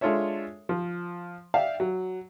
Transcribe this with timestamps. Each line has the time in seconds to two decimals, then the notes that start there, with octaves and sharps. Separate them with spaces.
0.01 G#3 D4 F4 A4 C#5 E5
0.69 F3
1.54 D5 E5 F5 G5
1.80 F#3